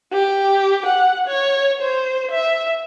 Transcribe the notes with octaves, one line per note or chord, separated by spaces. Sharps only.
G4
F#5
C#5
C5
E5